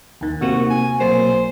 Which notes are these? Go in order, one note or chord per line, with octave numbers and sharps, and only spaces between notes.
D#2 D#3
C3 A#3 C4 F#4
G#5
B1 F#3 A#3 C5